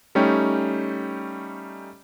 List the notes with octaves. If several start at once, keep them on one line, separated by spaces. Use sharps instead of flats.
G3 A3 C#4 D#4 G5